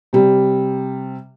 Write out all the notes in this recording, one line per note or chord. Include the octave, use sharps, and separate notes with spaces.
C3 G3